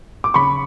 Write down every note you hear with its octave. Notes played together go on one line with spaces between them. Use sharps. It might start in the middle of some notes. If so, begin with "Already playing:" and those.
D6
C#3 B5 C#6